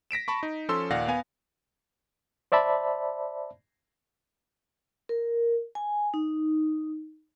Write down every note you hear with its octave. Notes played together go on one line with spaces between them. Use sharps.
A#6 B6 D7 E7
A5 B5 C#6
D#4
F3 C#4 A4 C6 E6
D#2 A#2 D5 F5 F#5 A#6
B3 F5 G#5
C5 D5 E5 A5 B5
A#4
G#5
D#4